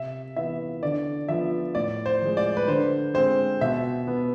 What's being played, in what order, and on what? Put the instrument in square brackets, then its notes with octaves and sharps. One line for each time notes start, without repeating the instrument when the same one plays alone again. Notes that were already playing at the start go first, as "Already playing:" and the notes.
Already playing: [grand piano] C3 E5
E3 B3 E5
D3 D5
F3 B3 E5
A2 D5
C5
F3 G#3
D5
B4
D3 C5
G#3 C4 C5
B2 E5
B3